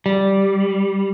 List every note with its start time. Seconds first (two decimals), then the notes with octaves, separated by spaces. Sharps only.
0.06 G3